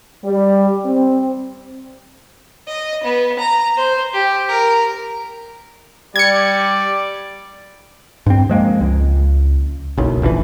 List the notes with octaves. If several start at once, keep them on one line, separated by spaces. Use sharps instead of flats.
G3
C4
D#5
B3
A#5
C5
G4
A#4
G3 D5 G#6 C#7
G2 C4
F3 G#3 A#3
C#2
F#1 B1 F#2
F1 A#1 A2 E3